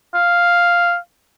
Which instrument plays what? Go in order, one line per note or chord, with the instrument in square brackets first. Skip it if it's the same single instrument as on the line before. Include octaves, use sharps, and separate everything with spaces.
[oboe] F5